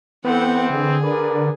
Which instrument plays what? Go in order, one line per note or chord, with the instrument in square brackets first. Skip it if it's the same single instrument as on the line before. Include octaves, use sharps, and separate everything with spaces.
[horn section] E3 C4 [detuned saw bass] B3 [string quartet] A4 F#5 G5
[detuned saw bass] D3 [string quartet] G#4
[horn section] A#4 B4 D5